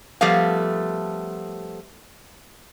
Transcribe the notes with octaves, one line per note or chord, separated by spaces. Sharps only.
F3 G3 A3 B3 F5